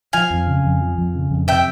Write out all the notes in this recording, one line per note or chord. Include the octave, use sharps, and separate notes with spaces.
F3 F5 G#5
F2
C#3
F2
F3
F2
C#3
F2
C3 E5 G5